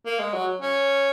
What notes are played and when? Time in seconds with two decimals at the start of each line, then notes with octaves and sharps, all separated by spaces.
0.06 A#3
0.19 G#3
0.34 F#3
0.61 C#4